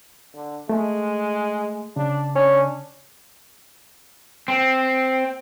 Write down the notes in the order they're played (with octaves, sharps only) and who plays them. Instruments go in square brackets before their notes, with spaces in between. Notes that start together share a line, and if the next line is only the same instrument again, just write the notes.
[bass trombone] D3
[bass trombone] G#3 [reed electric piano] A3
[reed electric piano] C#3 [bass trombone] D4
[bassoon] C#4 [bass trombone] D4
[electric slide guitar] C4